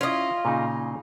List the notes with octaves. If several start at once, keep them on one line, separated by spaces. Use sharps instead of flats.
C#4 E4 F4 D#5
A#2 C#3 D#4